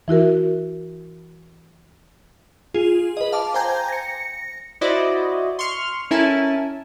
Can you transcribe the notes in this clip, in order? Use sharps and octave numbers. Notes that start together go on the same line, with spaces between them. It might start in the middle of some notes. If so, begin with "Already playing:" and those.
E3 E4 F#4 A#4
F4 G#4
B4 D#5
F5 A5 D6
C5 G5 G#5 A#5 G6 G#6
A#6 C#7
E4 F#4 C5 D5 D#5
C6 C#6 F6
C#4 E4 A4 A#4 G#5 A5